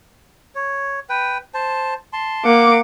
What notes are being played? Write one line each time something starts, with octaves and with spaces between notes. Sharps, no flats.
C#5
B4 G5
C5 A5
A5 C6
A#3 F#5 D6